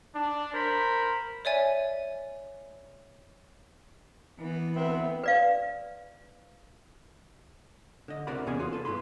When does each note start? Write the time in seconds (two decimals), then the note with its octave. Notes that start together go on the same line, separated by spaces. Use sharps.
0.14 D4
0.54 A#4 C5 B5
1.45 C#5 D5 E5 G#5
4.39 E3 B3
4.75 D2 B3 C4 E5
5.24 B4 D5 F5
8.08 D3 D#5
8.27 C#2 C3 A#4 D5 F#5 B5
8.47 E2 C3 B3 C#4 G#4 G#5
8.59 F4 F#4 G#4
8.73 A4 B4
8.85 G2 B3 E4 B5 C6